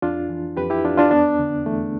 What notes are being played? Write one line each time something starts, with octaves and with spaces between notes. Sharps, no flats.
F2 D4 F4
E3
F2 G4 B4
E4 G4
F2 D4 F4
D4 F4
E2 B3 D4
D3
E2 A3